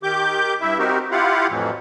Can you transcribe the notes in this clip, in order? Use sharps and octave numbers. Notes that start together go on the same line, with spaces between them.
D#3 G4 D6 G6
G2 E4 E5
C4 D#4 F#4 G4 A#4
E4 F4 G4 F5 F#5
F2 A2 E3 F#3